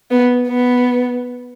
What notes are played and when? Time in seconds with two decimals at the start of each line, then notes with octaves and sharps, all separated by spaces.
0.11 B3
0.48 B3